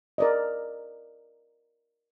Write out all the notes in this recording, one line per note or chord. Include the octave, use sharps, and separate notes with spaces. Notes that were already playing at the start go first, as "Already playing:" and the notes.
A#4 D5 D#5